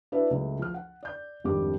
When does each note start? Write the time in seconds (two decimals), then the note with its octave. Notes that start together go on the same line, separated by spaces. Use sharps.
0.12 D4 E4 F#4 B4 D5 E5
0.31 C#2 F#3 A3
0.59 F3 F6
0.74 F#5
1.03 D5 G6
1.44 G#1 F2 G3 D4 G4 D6